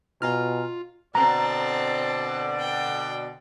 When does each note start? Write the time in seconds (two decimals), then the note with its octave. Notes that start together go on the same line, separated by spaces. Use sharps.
0.22 B2 F4 G#5 A#5 F6
1.15 B2 D3 C4 D5 A5 A#5
2.59 G5